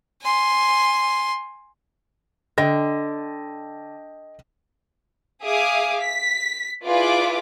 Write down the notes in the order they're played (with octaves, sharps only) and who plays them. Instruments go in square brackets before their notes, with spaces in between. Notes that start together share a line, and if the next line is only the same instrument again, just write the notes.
[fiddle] G#5 C6
[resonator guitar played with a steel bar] D3 [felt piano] D#5 G5 A#6
[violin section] G#4 E5 F5 D6 D#6
B6
E4 F4 G#4 B4 D5 D6